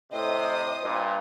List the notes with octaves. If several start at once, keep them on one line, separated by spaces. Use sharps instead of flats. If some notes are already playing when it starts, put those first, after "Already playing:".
A2 C3 C5 D#5 D#6
G2 A#2